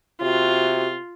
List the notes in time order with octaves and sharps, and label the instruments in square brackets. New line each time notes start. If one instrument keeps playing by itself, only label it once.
[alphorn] C3 [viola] F4 [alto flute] F#4